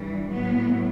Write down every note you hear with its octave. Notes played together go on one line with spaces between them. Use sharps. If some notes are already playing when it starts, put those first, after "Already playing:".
Already playing: G2 E3 G3
A2 F#3 B3